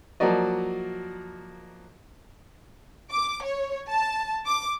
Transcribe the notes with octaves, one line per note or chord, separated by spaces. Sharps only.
F3 F#3 A#3 F#4 D5 D#5
D6
C#5
A5
D6